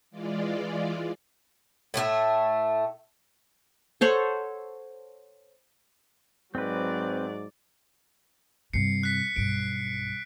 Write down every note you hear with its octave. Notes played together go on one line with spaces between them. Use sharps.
E3 G#3 F4 D5
A2 A3 F4 E5
A4 C5 C#5 F#5
G#2 F#3 C4 B4 D5
G2 C3 C7 C#7
F#6 B6
B1 G2 D7